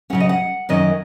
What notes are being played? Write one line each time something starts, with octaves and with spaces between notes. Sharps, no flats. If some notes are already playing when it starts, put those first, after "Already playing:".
C#3 F#3 C#4 F#5
D#5
F#5
F#2 D#3 F#3 C#4 D#5